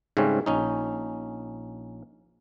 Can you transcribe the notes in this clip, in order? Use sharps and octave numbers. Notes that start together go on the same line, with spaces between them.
G#2 C#3 G3 A3 C4 C#4
A#1 C#4 D#4